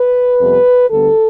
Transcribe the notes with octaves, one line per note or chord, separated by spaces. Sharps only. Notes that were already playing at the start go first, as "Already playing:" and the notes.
Already playing: B4
F2 C3 G3 B3
D2 D3 G3 B3 A4